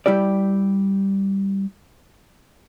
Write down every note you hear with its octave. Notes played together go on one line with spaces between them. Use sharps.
G3 E4 G4 D5